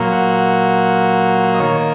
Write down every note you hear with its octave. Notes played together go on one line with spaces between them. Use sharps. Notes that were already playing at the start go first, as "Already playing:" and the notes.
Already playing: A#2 F#3 A#3
F#5
F#5
D#5
D#3 A#3 C#5